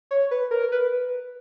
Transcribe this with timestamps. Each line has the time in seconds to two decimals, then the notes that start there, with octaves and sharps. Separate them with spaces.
0.11 C#5
0.31 B4
0.51 A#4
0.72 B4